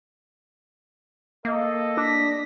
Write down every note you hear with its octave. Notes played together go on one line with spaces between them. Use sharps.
A#3 A4 D#5
D4 A#6 B6